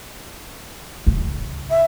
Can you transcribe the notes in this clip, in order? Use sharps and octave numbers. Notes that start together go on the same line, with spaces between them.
C#3
E5